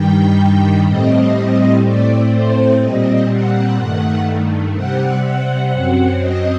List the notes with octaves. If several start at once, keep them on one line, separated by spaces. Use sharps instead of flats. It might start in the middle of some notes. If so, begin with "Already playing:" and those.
Already playing: G2 D#3 G3 G5
A2 G3 C4 D#5
A2 A3 C4 D5
C5
A#2 G3 C4 D#5
F#5
G2 D#3 A3 F#5
C3 G3 C4 F#5
F#5
F#2 F#3 C4
D#5